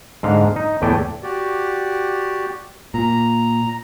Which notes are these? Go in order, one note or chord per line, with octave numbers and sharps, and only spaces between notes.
G#2 D3 F5
D#4
E2 A2 A3 D5 G5 G#5
F#4 G4 D5
A#2 A#5